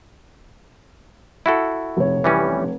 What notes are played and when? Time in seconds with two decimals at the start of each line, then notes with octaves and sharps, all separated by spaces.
1.46 E4 F#4 A4
1.97 F1 C#5
2.24 E3 G3 C#4